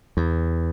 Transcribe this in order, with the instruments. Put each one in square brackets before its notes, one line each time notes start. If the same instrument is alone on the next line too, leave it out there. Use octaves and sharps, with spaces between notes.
[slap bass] E2